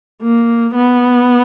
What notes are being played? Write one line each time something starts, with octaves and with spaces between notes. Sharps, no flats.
A#3
B3